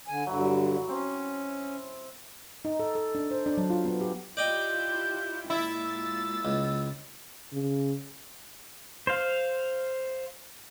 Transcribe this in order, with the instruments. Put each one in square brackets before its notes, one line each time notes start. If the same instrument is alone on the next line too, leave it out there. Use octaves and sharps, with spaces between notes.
[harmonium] D3 G#5
[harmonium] G2 D3 [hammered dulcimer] F#3 E4
[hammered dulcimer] C4 [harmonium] C#4
[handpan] D#4
A4
A4
D4
C5
D4
F#3
F4
B3
G4
[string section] E4 F4 G4 [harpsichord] D5 D#5 G5 [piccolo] G6
[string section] A#2 G#3 A6 [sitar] E4
[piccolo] E6
[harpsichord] C#2
[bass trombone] C#3
[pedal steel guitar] C5 F5